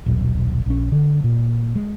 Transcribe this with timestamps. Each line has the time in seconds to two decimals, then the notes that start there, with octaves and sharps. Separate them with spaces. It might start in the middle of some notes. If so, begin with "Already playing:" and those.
0.06 D#1 B1
0.66 A#1 C#4
0.92 D3
1.24 A#2
1.75 G#3